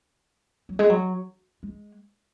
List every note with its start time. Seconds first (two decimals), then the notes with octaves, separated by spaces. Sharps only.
0.69 F#3
0.79 G#3
0.90 F#3
1.63 G#3